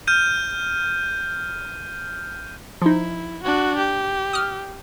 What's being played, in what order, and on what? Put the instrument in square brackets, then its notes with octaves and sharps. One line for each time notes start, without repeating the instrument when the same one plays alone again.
[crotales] F6 G6 D#7
[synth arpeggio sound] F3 D#4 [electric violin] E4
[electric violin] D4 F#4
G4
[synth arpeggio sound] D#6 F6